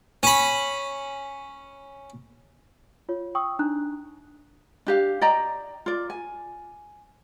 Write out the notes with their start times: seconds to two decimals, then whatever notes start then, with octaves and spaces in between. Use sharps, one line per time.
0.23 C#4 B5
3.09 F4 C#5
3.35 G5 C#6 D#6 E6
3.59 D4 D#4 A#5 F#6
4.86 D4 G4 F5
5.21 D5 D#5 G5 A#5
5.86 F4 D5
6.10 G#5